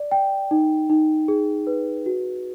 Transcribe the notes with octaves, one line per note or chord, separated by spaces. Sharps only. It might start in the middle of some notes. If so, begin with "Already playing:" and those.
Already playing: D5
G5
D#4
D#4
G#4
B4
F#4